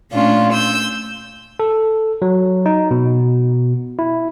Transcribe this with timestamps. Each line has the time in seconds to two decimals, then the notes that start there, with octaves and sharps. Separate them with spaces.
0.10 A#2 A3 C#4 D4 F4
0.52 E6 G6
1.60 A4
2.22 F#3
2.66 D#4
2.91 B2
3.99 E4